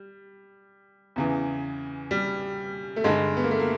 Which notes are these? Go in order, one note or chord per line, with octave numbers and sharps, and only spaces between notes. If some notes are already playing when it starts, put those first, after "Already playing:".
Already playing: G3
E2 C#3 E3
G3
A3
G2 D3 G#3
B3
A#3
A3
A#3